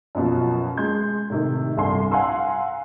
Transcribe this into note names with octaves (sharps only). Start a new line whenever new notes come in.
F#2 B2 F3
G#3 C6 G6 G#6
A2 C3 D#3
G1 C2 D3 G#5 C6
F5 F#5 G#5 A#5 C6 E6